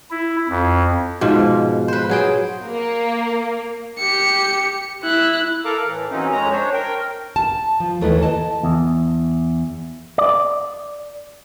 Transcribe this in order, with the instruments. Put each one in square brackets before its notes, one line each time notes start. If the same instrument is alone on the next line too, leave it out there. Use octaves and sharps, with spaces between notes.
[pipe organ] E4
F2
[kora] G#2 B2 F3
B4 C5
F#3 G#4 G5
[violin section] A#3
[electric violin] G4 C#7
E4 F#6
[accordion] A4 A#4 F5 A#5 D6
A2 E3
E3 F#3 A#3 C4 C#4 D#4
F2 G#3 C#4 A#5
D4 C5 C#5
A#4 G5
[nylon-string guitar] A5
F3
D#2 E3 A3 E4 B4
D#5 A5
[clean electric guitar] E2
D5